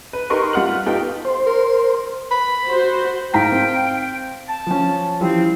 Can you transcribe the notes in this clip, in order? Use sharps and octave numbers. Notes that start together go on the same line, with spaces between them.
B4
D#4 G4 A#4 B4 C6 C#6
G3 F4 F#5 F6 F#7
B3 D#4 F4 G4 A4 G5
C5
A#4
B5
F#4 C5
G#2 C5 F5 G5 A#5 B6
C4
A5
F3 C#4
E3 F3 G3 C4